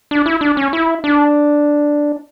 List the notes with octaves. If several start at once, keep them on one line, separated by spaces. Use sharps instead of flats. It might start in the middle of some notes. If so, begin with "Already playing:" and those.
D4
E4
D4
C#4
E4
D4